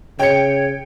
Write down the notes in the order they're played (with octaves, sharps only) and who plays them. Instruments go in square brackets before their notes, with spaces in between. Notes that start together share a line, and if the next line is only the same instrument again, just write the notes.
[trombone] C#3 [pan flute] C#5 [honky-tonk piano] G5 C#7